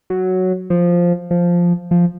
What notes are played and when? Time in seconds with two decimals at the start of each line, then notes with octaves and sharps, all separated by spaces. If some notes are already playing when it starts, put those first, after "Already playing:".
0.10 F#3
0.70 F3
1.31 F3
1.91 F3